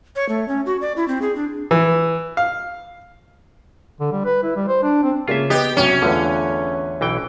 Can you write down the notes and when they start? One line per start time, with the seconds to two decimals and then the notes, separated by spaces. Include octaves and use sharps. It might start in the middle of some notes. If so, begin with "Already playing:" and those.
0.16 C#5
0.29 A3
0.48 C#4
0.66 F#4
0.81 D5
0.96 E4
1.08 C4
1.22 G#4
1.36 D4
1.71 E3
2.37 F5
4.00 D3
4.12 G3
4.25 B4
4.44 E4
4.56 G3
4.68 C5
4.83 D4
5.03 C4
5.28 C#3 A#3 C#4 F4 E5
5.50 B3 G4 B4 D#5
5.77 C2 F#3 C#4 G5
6.02 E2 D3 A3 F4 B4
7.01 B1 E3 G5